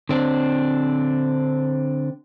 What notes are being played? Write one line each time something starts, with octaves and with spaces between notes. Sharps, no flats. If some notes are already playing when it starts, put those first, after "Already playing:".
D3 C4 D4